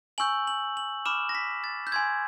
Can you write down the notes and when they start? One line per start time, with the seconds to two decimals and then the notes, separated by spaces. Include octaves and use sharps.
0.18 G#5 C#6 E6 G6 F#7
0.47 F#7
0.77 F#7
1.06 B5 D6 F6 E7
1.29 A#6
1.35 B6
1.64 A6
1.87 G6
1.92 G#5 C6 E6 G#6